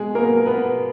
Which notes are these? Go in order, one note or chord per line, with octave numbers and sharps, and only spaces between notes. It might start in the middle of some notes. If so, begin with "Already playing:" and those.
Already playing: B2 G#3 G#4
F#3 A#3 B3 A#4
A#4
B2 B3 B4